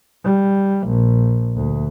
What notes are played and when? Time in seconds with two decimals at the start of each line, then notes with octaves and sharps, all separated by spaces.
0.24 G3
0.88 A#1
1.56 D2